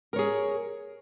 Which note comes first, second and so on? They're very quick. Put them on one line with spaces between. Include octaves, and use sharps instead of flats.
A#4 C#5 G#4